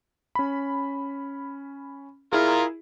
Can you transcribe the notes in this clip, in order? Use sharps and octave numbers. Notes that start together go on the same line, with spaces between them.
C#4 B5
E4 F4 G#4 A#4